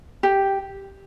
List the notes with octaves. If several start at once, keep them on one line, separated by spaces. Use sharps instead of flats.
G4